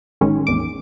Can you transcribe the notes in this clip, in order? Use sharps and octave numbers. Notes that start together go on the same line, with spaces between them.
A1 D#3 G#3 C#4
A1 E2 D6